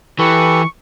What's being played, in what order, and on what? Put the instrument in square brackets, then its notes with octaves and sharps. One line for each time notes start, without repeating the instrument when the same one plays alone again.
[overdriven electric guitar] E3 [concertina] G4 A4 B4 [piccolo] C#6